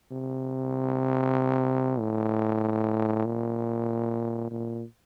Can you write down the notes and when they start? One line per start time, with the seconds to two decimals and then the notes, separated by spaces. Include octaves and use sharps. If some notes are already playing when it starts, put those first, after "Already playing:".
0.12 C3
1.99 A2
3.25 A#2
4.51 A#2